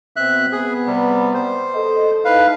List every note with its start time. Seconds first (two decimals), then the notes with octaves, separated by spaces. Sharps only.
0.16 B2 C4 E5 F#6
0.52 B3 G#4
0.87 C3 G3
1.34 C5
1.74 A4 D#5
2.25 D#4 E4 A4 B4 F5